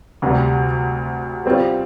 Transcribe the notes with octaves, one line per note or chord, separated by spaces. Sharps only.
D2 C3 G3
G3 C4 F4